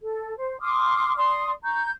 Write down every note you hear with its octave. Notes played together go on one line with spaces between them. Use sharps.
A4
C5
C6 D6 D#6 F6
D5 C6 D#6
A#5 C#6 G6